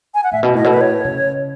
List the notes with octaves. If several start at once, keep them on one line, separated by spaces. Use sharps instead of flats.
G#5
F#5
A2 E5
B2
A2 D#5
B2 A4
B4
A2 C#5
C#3